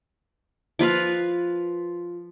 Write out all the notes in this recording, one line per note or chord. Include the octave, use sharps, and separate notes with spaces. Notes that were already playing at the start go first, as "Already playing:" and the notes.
F3 F4 B4 F5